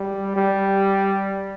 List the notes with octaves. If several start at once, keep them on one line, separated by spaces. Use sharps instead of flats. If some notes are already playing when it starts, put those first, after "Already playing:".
Already playing: G3
G3